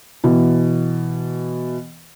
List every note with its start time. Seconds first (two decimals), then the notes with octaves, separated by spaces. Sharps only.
0.24 B2 E3